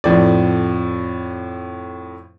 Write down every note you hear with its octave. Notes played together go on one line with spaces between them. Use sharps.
F2 A2 D5